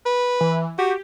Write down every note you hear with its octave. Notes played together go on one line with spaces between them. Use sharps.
B4
E3
F#4 G4